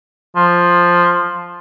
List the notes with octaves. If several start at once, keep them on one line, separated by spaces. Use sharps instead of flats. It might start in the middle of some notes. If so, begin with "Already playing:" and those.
F3